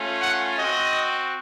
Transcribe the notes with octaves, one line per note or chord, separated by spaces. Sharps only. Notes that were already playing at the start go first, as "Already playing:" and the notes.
Already playing: A3 C#4 F4
F#5
C4 F#4 D#5